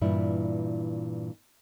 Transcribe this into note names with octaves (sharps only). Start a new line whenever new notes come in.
G2 A#2 E3 E4